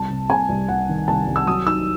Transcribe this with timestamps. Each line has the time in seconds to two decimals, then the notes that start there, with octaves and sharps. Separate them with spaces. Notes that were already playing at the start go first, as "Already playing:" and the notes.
Already playing: C2 A5
0.10 C3
0.30 C2 G#5
0.49 C2
0.68 C2 F#5
0.89 D#3
1.08 C2 A5
1.28 C2
1.36 E6
1.47 F#3 D#6
1.66 D#4 E6